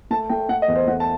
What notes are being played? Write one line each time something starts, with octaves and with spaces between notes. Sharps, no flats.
A3 A5
A3 G5
A3 F#5
D#5
E2
C5
A3 F#5
A5